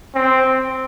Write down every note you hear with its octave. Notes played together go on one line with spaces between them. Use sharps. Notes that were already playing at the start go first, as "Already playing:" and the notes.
C4